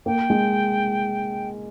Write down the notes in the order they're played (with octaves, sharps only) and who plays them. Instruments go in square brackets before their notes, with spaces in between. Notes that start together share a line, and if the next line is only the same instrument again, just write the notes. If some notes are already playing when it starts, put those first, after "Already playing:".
[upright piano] A#3 [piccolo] G5
[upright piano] G#3